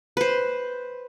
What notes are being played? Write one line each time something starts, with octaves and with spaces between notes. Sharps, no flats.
B4 C5